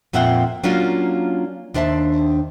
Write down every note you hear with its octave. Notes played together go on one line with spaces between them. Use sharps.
F2 A#2 C4 E5 F#5 G5
F#3 A#3 C#4 D4 F4 F#4
D#2 D4 C5 E5 A5